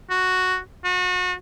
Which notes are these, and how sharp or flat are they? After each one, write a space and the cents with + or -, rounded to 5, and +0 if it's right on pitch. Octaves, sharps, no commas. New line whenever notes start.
F#4 +0
F#4 -30